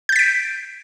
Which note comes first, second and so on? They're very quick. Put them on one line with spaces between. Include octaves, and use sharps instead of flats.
G6 A6 B6 D7